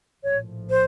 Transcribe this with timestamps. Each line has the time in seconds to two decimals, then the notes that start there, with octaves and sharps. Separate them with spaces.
0.23 A#1 A2 F3 C#5
0.70 C5